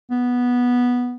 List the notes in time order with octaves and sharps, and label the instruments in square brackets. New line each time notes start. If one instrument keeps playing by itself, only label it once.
[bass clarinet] B3